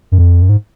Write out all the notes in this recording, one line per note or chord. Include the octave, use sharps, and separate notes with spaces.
F#2
F2
F#2
G#2